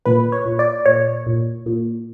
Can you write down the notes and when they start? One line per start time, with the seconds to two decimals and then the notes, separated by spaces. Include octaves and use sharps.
0.05 A#2 B4
0.32 C#5
0.46 A#2
0.59 D5
0.85 A#2 C#5
1.26 A#2
1.66 A#2